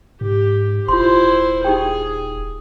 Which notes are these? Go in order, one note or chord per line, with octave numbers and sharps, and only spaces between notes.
G#2 G4
D#1 E4 F4 C5 C6
D#4 G4 G#4 G5